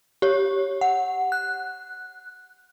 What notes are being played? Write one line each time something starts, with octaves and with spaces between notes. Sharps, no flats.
G4 C#5
F#5
F#6